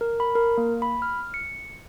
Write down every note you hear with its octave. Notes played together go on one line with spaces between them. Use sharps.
A#4
B5
A#4
A#3
B5
F6
C#7